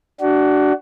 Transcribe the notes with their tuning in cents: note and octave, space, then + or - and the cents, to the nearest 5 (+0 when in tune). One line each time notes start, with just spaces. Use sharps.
D4 +0 F#4 +25